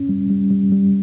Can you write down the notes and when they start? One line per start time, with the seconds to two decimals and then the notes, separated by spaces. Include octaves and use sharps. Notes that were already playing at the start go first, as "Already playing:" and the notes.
Already playing: C#4
0.09 G3
0.30 G3
0.51 G3
0.72 G3